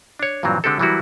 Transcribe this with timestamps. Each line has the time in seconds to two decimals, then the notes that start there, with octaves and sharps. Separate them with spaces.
0.19 D4 C#5
0.43 G2 A#2 E3 F#3 C4
0.64 D3 G#3 C4 G4 A4
0.79 E3 F#3 G3 A#3 E4 F#4